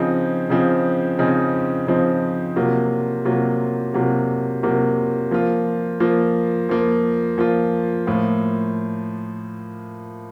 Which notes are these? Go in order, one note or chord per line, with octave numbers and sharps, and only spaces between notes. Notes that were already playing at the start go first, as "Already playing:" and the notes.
Already playing: C#3 F3 C4 D#4
C#3 F3 C4 D#4
C#3 F3 C4 D#4
C#3 F3 C4 D#4
C3 F#3 A#3 F4
C3 F#3 A#3 F4
C3 F#3 A#3 F4
C3 F#3 A#3 F4
F3 A#3 F4
F3 A#3 F4
F3 A#3 F4
F3 A#3 F4
A2 F3 A#3 F4